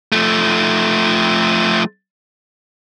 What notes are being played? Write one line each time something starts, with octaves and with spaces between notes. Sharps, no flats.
F3 A3